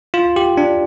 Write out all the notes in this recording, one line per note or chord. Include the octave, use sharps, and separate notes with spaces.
F4
G4
D4